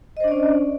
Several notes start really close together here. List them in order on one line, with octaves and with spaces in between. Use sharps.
D#5 C5 D4 D5 C#4